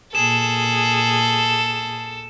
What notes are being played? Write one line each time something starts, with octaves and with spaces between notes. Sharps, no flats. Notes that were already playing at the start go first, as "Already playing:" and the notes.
A#2 G#4 A4 E7